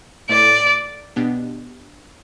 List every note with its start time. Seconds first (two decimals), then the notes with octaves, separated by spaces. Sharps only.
0.29 A2 A3 E4 A4 D5
1.16 B2 B3 D4 G4